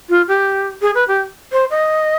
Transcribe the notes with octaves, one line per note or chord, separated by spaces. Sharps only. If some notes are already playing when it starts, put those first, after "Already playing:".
F4
G4
G#4
B4
G4
C5
D#5